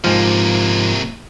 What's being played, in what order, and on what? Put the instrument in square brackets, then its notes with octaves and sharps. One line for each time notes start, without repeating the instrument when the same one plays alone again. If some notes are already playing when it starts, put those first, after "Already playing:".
[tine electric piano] G#2 F3 [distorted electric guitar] C3 A#3